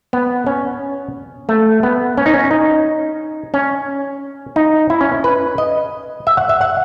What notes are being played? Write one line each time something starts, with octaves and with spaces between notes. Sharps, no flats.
B3
C#4
A3
B3
C#4
D#4
C#4
D#4
C#4
D#4
E4
C#4
B4
D#5
E5
F#5
E5
F#5